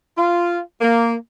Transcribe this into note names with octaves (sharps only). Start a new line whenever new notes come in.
F4
A#3